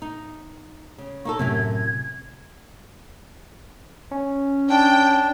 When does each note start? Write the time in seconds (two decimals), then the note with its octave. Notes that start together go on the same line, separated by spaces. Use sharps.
0.02 D#4
0.98 C#3
1.25 A#3 D#4 A4 C#6
1.39 F#2 A2 C3 C#4 G#6
4.11 C#4
4.70 D4 G5